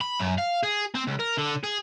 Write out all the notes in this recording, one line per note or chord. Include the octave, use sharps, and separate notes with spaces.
B5
F#2
F5
G#4
C4
C#2
A#4
D3
G#4